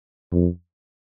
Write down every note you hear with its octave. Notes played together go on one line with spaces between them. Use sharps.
F2